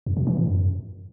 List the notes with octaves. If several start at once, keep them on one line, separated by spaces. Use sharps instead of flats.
F2
B2
E3
A2
F#2